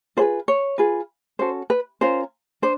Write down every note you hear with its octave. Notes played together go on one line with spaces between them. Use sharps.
F4 G#4 B4 C5
C#5
F4 G#4 B4
C#4 F#4 A4 C5
B4
C#4 F4 A#4 C5
D4 C5